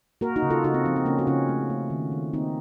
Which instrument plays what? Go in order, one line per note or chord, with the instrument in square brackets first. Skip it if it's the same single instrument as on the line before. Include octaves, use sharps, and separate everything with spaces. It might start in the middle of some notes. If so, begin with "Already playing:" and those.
[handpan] A#3 F#4 A#4
D#4 F#4
C#3
F4 A4
C#3 D#4 F#4
C4
F3 C4
C4
C#3 A#3 C#4
F#4
C#3 C#4 F4
A3
A3
D#3
D#3
A#3 C4 D#4